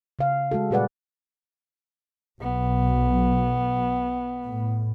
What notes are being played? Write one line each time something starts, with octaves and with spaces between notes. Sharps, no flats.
C#3 F5
G#3 F#4 A4
A#2 G3 G#4 B4 D5 F#5
B1 B3
A2